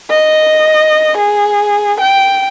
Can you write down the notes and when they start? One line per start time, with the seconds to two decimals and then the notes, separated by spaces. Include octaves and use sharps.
0.10 D#5
1.18 G#4
2.01 G5